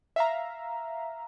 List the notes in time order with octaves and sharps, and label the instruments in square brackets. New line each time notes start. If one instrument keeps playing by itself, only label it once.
[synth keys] E5 F5 A#5